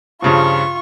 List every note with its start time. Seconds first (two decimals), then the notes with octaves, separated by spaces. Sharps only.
0.22 G2 C#3 F3 F4 C#6